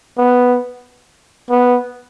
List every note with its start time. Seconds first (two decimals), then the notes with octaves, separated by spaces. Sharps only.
0.18 B3
1.50 B3